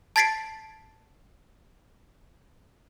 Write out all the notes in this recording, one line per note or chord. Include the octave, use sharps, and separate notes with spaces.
A5 G#6 A6 B6 C7 D7